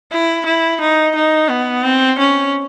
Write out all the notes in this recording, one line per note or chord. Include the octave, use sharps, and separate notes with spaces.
E4
E4
D#4
D#4
B3
C4
C#4